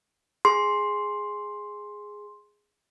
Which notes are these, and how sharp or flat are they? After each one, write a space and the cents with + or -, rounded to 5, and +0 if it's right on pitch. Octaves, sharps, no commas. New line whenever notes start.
G#4 +0 C6 +5